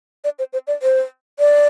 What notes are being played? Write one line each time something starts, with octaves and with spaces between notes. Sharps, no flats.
D5
C5
C5
D5
C5
D5